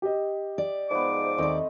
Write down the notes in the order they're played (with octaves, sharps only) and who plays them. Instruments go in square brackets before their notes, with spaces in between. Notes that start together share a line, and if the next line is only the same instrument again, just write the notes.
[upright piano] G4 D#5
[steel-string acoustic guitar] D5
[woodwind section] G#2 F3 D6 [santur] B3 C5
[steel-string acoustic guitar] D#2 D5 [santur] A3 C4 D#5